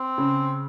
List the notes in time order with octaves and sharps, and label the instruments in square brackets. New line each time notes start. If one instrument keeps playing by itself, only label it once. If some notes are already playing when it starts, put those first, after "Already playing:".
Already playing: [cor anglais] C4
[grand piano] C#3